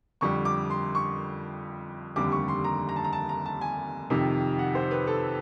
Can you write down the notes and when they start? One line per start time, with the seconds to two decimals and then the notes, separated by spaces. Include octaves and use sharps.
0.21 F2 D3 G3 C#6
0.45 D6
0.70 C6
0.95 C#6
2.16 F1 D#2 D3 G3 D6
2.32 C#6
2.48 C6
2.64 A#5
2.89 A#5
2.96 A5
3.04 A#5
3.13 A5
3.29 A#5
3.46 A5
3.61 G#5
4.10 F2 C3 D#3
4.59 F#5
4.75 C5
4.91 B4
5.07 A4